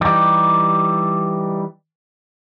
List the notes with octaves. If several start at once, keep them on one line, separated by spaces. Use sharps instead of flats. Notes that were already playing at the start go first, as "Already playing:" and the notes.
E3 G3 D#4 G4